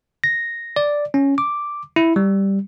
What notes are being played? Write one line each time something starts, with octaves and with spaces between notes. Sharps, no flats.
A#6
D5
C#4
D6
E4
G3